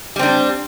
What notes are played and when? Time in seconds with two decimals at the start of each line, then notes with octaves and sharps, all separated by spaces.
0.16 G3
0.19 C4
0.23 D4